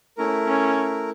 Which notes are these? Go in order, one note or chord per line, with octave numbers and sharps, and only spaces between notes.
A3 C#4 E4 A#4
C#4